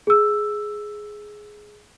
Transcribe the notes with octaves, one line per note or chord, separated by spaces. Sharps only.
G#4 E6